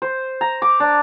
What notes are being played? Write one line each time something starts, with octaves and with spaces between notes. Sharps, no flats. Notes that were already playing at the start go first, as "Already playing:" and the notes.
C5
A#5
D6
D4